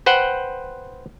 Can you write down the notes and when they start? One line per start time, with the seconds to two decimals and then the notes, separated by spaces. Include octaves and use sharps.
0.06 B4 C5 F#5 G5